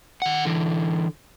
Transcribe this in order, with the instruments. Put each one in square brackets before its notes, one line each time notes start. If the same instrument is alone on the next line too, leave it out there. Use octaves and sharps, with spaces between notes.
[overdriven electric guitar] D#3 F#5
D3 E3